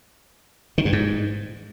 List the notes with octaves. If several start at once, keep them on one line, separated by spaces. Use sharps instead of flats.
D#3
G2
G#2